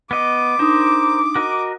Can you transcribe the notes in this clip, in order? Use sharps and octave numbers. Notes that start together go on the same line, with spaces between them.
B3 D#5 D6
D4 D#4 A#4 C5 D#6
F#4 A#4 D#5